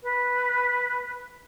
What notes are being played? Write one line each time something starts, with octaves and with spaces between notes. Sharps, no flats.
B4